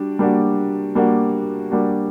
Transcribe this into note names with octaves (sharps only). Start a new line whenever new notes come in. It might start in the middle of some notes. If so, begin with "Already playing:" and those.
Already playing: G3 D4 F#4
G3 A#3 D4 F#4
G3 A#3 D4 F#4
G3 A#3 D4 F#4